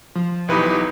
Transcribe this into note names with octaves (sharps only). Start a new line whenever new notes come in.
F3
B1 E3 D#4 G4 B4